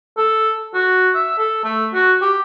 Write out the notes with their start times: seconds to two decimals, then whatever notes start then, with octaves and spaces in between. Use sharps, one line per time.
0.18 A4
0.74 F#4
1.14 E5
1.38 A4
1.64 A3
1.94 F#4
2.22 G4